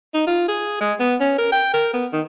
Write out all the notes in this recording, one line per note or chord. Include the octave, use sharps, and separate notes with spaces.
D#4
F4
G#4
G#3
B3
C#4
A#4
G5
A#4
B3
D#3